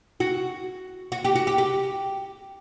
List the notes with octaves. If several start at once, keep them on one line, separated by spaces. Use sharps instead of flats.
F#4
F#4
G4
F#4
G4
G4